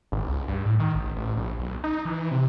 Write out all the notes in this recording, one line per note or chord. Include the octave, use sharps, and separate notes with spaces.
G#1
C#2
G2
A2
D#3
A1
A1
A#1
B1
D#4
E3
C3